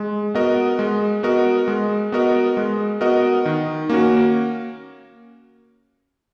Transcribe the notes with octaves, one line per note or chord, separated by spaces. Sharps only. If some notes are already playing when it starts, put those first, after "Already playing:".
Already playing: G#3
B3 F#4 A#4 D#5
G#3
B3 F#4 A#4 D#5
G#3
B3 F#4 A#4 D#5
G#3
B3 F#4 A#4 D#5
D#3
A#3 C#4 F#4 A#4